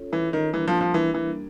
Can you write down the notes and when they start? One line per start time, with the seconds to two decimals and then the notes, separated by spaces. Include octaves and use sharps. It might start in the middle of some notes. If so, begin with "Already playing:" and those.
Already playing: C#4 F4 A4 C#5
0.13 E3
0.33 D#3
0.53 E3 G3 A#3 D4 G4 A#4
0.68 F3
0.81 F3
0.94 E3
1.14 E3